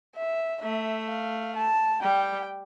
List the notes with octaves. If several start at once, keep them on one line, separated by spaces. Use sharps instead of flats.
E5
A3 E5
F5
A5
G3 G5